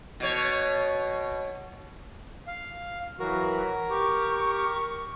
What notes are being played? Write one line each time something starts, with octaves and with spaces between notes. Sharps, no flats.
B2 C#5
F5
E3 F#3 F#4 A#4 B4
G4 C#6